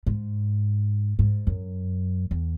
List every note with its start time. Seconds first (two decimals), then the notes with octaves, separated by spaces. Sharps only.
0.06 G#2
1.19 G#2
1.47 F#2
2.31 E2